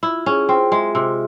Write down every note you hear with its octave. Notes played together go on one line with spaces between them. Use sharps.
E4 F4
C#4 G#4
C4 F4
G#3 E5
C3 F4